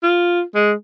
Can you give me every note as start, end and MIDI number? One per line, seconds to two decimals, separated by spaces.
0.03 0.42 65
0.55 0.72 56